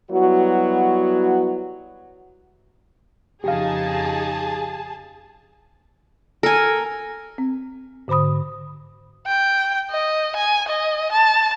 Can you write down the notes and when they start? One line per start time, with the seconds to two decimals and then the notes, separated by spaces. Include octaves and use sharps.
0.11 F#3 G3 B3 E4 F#4
3.44 F2 C#3 D#4 G4 G#4 F5 A5
6.43 A4 A#4 G#5
7.38 C4
8.08 G#2 D3 C5 B5 D#6
9.27 G5
9.90 D#5
10.36 G#5
10.68 D#5
11.12 A5